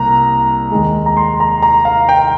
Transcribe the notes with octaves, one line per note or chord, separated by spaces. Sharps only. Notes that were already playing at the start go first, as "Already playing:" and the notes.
Already playing: C2 A#3 A#5
D#2 D#3 G#3
A#5
C6
A#5
A#5
F5
G5